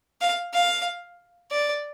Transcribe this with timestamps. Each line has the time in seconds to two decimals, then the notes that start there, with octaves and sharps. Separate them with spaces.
0.21 F5
0.54 F5
1.51 D5